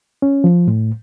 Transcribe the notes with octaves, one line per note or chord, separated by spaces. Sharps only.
C#4
F3
A2